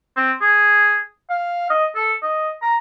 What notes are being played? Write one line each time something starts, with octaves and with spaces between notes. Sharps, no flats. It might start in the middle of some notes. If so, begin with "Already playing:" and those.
C4
G#4
F5
D#5
A4
D#5
A#5